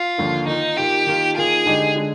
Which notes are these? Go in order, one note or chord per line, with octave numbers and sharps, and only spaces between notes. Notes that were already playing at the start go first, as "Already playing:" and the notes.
Already playing: F4
D#2 D3 F3 A#3
D#3 A#3 D#4 F4
D#3 A#3 F4 G4
D#3 A#3 F4
D#3 A#3 F4 G#4
D3 G#3 D#4 G4
D3 G#3